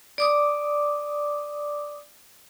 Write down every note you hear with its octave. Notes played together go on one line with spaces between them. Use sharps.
D5 D6 D#6